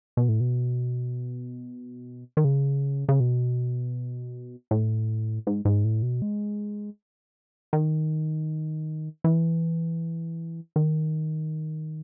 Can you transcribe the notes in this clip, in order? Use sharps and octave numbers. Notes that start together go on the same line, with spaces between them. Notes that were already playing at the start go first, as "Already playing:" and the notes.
B2
A2
B2
D#3
C#3
C#3
B2
A2
G#2
G#2
A2
B2
G#3
D#3
E3
D#3